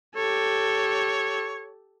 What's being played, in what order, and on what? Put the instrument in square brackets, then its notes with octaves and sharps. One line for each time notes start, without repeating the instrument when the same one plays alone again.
[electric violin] G4 A4 [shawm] C#5